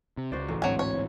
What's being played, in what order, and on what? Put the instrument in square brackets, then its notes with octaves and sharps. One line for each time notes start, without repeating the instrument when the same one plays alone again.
[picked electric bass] C3
[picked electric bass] C#2 [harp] F#4 C5 D5
[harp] A1
[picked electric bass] D2 G#2 C4 [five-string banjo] F#3 G#5
[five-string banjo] C#5